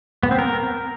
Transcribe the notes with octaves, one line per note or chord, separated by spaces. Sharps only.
B3
C4
A#4